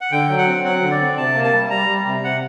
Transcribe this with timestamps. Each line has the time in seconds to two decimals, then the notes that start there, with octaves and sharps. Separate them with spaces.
0.01 F#5
0.11 D3 G5
0.29 F#3
0.38 F#5
0.47 C4
0.64 F#3 F#5
0.82 D3
0.91 D5
1.00 C4
1.17 C3 A5
1.35 A#3
1.44 A5
1.53 G3
1.70 G3 A#5
1.88 G3
2.06 C3
2.24 C3 F#5